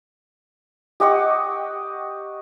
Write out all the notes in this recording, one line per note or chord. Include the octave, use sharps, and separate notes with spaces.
G4 D#5 F#5 C#6